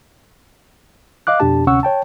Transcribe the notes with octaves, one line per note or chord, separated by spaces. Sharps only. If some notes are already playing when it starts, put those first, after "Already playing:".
D#5 F5 D6 F#6
F2 B2 D4 G4 A5
D2 C3 C#4 F#5 C#6 E6
C#5 G5 A5